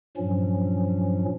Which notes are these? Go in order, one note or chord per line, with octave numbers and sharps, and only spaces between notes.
G2 A#2 F3 F#3 C#4